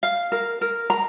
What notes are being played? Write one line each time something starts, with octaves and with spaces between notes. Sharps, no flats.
F5
A#4
A#4
A#5